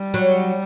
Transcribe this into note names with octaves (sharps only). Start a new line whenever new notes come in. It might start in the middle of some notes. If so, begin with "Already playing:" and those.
Already playing: G3
F#3